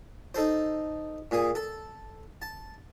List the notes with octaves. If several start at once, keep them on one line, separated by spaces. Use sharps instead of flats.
D#4 A4 C5
A#2 G#4
A4
A5